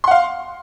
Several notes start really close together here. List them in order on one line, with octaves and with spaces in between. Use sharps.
C6 F#5 F5